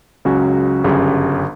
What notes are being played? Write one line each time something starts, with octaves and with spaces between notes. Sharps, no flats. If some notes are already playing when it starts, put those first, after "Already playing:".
C#2 C#3 F#3 C#4 F#4
G1 F#2 C#3 G3